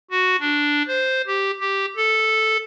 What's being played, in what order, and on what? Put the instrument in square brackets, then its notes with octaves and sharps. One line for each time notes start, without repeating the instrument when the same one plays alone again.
[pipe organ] F#4
D4
C5
G4
G4
A4